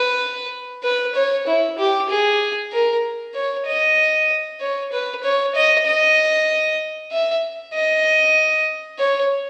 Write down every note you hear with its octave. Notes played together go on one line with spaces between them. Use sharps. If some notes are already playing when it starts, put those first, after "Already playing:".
Already playing: B4
B4
C#5
E4
G4
G#4
A#4
C#5
D#5
C#5
B4
C#5
D#5
D#5
E5
D#5
C#5